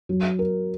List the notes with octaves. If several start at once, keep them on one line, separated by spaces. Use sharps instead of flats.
F#3
A#4